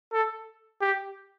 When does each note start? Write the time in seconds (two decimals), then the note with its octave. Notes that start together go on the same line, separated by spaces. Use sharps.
0.13 A4
0.81 G4